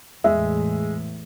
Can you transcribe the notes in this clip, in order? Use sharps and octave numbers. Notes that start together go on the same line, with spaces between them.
E2 A2 G#3 E5